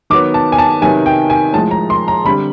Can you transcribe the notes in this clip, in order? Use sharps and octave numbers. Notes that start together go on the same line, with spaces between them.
D#3 F#3 B3 D6
A5
G#5
A5
C3 D#3 F#3 B3 G#5
G5
G#5
A2 F3 G#3 A5
A#5
C6
A#5
D3 G3 C4 B5